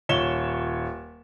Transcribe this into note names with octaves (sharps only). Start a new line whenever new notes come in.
D#1 C#5 E7 G7